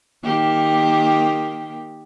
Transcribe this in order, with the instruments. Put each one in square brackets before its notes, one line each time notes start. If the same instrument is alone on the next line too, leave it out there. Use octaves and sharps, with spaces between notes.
[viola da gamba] D#3 A#3 G4